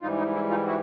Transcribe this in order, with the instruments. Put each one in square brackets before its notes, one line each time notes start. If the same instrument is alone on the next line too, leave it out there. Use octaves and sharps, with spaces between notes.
[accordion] G#2 E3 G3 D#4 F4
D#4
E4
D#4 F4
E4 F#4